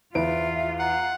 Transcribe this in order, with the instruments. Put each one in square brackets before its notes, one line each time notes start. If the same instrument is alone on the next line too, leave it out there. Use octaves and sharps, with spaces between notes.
[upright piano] E2 B4 D7 [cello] F4 [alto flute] E5
[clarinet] F#5 [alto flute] A#5